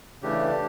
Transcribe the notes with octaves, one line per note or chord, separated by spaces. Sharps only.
C#3 E3 A3 D4 G4